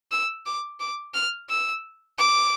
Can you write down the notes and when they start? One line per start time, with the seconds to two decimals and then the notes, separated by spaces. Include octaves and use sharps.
0.11 E6
0.46 D6
0.80 D6
1.14 F6
1.50 E6
2.18 D6